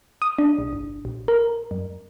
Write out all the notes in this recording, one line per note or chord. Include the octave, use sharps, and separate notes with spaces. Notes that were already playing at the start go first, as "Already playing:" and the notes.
D#6
D4
B1
G1
A#1
A#4
F#2